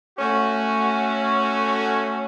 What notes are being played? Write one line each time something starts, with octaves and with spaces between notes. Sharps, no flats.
A3 C#4 F#4